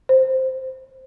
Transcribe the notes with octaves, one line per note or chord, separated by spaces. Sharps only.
C5